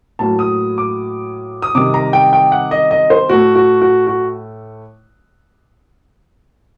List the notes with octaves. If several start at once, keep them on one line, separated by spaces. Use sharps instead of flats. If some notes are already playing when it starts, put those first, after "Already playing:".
A2 F#3 A#3 A5
D#6
D6
D#6
C3 D#3 G3 D6
A#5
G5
G5
F#5
D#5
D#5
C5
A2 A3 F#4
F#4
F#4
F#4